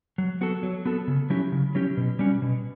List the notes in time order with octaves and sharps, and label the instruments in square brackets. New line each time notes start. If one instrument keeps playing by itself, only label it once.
[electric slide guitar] F#3
B3 F#4 A4
F#3
B3 F#4 A4
C#3
F#3 C#4 E4 G4
C#3
F#3 C#4 E4 G4
B2
G3 C#4 F#4
B2